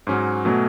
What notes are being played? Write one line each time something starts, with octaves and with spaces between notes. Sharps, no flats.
G#2 F#3 C#4
B2 F#3 A3 C#4